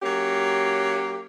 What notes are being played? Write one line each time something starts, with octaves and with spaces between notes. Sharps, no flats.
F#3 A#3 C#4 G4